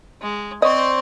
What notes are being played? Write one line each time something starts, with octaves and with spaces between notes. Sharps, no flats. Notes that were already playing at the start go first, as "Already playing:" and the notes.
G#3
C4 C5 D5 D#5 C#6